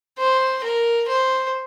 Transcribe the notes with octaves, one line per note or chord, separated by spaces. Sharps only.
C5
A#4
C5